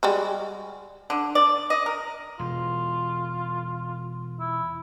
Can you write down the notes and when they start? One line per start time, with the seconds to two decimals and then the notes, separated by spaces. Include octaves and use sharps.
0.03 G3 G#3 F#4
1.10 D3
1.35 D5
1.70 D#5
1.86 A#4
2.39 E1 F4
4.40 E4